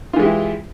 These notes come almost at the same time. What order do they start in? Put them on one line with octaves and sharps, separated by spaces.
F4 E3 G#3 G4 E4